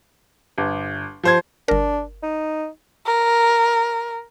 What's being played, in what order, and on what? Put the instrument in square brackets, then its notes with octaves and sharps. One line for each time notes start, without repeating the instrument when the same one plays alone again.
[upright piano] G1
F3 C5 G#6
[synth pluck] G1 A#4 [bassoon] D4
[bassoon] D#4
[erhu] A#4